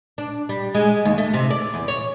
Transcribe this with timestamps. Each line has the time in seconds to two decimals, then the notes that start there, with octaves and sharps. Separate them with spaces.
0.18 D4
0.49 G3
0.75 G#3
1.05 D#2
1.18 A3
1.34 C3
1.51 D5
1.74 E2
1.88 C#5